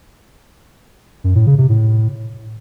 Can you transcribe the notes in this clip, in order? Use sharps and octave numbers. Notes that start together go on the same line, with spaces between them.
F#2
A2
C#3
C3
A2